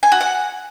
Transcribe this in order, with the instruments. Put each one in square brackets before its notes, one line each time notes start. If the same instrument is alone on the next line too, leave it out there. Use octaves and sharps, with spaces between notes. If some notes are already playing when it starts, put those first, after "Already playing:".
[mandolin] G#5
F#4
F#5